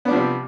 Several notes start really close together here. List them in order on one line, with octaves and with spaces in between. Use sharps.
B3 D4 F3 C3 G3